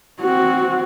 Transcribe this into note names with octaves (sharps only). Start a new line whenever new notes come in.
C4 F#4